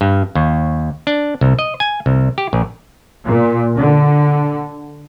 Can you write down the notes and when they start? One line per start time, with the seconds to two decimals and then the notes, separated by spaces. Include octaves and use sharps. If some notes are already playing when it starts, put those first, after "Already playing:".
0.01 G2
0.35 D#2
1.07 D4
1.41 C2
1.59 D#5
1.80 G#5
2.06 C2
2.38 G4
2.53 A#1
3.25 A#2
3.76 D3